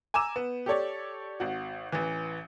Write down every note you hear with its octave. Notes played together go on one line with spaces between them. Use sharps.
G#5 A#5 D6 E6 E7
B3
G4 A4 C#5 D5
G#1 F#4
A1 E3